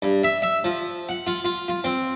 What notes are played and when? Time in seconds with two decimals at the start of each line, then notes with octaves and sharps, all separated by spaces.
0.02 G2
0.24 E5
0.42 E5
0.64 F3
1.09 F#5
1.27 F4
1.45 F4
1.68 F4
1.84 C4